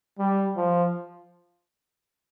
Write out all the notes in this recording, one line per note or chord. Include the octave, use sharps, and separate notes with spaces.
G3
F3